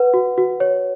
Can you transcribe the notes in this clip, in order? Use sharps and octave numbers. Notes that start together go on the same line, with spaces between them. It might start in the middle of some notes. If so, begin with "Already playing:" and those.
Already playing: B4 F#5
F#4
F#4
C#5